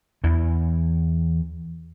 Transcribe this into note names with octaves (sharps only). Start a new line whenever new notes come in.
E2 E3